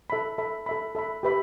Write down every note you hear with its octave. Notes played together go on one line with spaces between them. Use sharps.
A4 E5 B5
A4 E5 B5
A4 E5 B5
A4 E5 B5
G4 B4 E5 B5